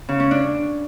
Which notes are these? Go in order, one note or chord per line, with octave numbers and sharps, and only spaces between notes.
C#3
C#4
D4